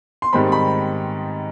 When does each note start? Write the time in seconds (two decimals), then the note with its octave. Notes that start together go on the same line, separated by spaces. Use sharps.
0.22 C6
0.33 G#2 D#3 G3 C4 B5
0.52 B5